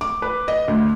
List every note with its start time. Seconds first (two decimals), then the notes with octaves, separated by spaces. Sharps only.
0.01 D6
0.22 B4
0.48 D#5
0.68 D2